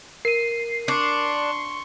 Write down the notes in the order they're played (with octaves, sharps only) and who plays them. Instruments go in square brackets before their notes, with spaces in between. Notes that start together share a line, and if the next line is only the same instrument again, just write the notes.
[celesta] A#4 D#7 [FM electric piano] C7
[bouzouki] D4 [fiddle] C6 C#6